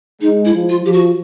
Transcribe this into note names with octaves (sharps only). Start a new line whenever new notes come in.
G#3 D#4
E4
F3
F4
F3 G4
F#4